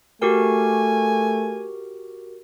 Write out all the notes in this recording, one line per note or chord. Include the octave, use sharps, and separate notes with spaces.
A3 F#4 G4 A#4 G#5